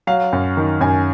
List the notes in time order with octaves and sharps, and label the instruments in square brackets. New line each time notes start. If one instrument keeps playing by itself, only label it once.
[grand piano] F#3 F5
F#2
D#3
F#2 G#5